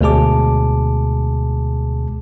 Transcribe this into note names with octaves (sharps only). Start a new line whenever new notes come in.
D2 B2 G#3 G#4 A5 D6